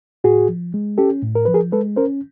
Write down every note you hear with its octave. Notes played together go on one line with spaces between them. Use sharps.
A2 F#4 G#4
F3
G#3
C#4 G4 A4
A2
A#4
F3 B4
G#4 A#4
G#3 A4 B4
C#4 A#4 C5